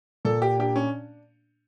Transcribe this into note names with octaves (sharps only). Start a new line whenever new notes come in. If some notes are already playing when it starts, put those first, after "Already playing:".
A#2 A4
G4
D4 G4
C#4